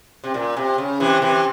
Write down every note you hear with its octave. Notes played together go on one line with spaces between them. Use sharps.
C3
A#2
C3
C#3
C3 E3
C3 E3